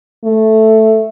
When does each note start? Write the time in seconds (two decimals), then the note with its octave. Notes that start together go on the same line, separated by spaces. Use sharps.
0.24 A3